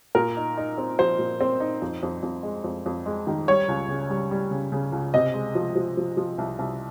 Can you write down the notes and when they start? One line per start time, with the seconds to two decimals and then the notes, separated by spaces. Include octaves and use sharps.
0.15 A#2 A#4
0.37 D#4
0.58 D#4
0.78 C4
0.99 F3 C5
1.19 A#2
1.41 C4
1.60 D#4
1.82 F2
2.03 F2
2.23 F2
2.43 G#3
2.64 F2
2.86 F2
3.06 G#3
3.27 D#3
3.48 G3 C#5
3.68 C#2
3.89 C#3
4.10 G3
4.31 G3
4.51 C#3
4.72 C#3
4.92 C#2
5.14 C3 D#5
5.34 G#3
5.55 F3
5.76 F3
5.97 F3
6.17 F3
6.38 C2
6.59 C2